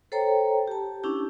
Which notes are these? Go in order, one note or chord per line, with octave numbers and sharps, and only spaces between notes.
A4 C5 C#5 G5 A#5
G4 A5
C#4 D4 E4 G4